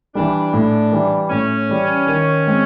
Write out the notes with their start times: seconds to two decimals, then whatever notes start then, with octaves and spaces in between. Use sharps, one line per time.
0.15 E3 G3 D4
0.53 A2
0.92 E3 G3
1.30 A2 C#4
1.69 E3 G3
2.07 D#3
2.47 G#3 C4